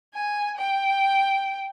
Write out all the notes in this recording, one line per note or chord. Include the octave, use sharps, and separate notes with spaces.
G#5
G5